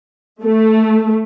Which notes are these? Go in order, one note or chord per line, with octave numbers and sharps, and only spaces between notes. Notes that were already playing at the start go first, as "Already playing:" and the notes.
A3